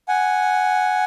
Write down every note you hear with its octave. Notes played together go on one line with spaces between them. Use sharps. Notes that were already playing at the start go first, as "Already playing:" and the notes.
F#5 G#5